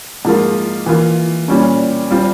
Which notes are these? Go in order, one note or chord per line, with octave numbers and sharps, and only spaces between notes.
G#2 F3 A#3 F4
E3 A#3 F4
A#2 G3 C#4
G3 C4 F4